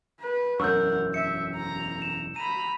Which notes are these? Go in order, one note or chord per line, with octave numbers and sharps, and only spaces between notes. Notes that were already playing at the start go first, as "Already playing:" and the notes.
B4
E1 F#2 A#4 F#5 C#6 E6 G6
E5 C#7
A#5
E7
A#5 B5 D#7